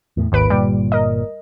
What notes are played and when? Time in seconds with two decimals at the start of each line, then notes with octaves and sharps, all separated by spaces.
0.17 E2 A2
0.32 G#1 D#2 B4 D7
0.50 G1 A#2 G3
0.92 A#4 D#5